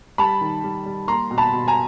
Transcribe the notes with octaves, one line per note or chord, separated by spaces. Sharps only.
G3 A5 B5
D#3
G3
G3
A#3 A#5 C6
B2
A5 B5
B2
G#5 A#5